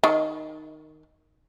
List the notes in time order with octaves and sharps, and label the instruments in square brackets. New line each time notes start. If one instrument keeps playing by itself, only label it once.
[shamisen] D#3